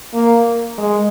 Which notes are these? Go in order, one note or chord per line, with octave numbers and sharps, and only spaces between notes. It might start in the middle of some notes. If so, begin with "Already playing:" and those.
A#3
G#3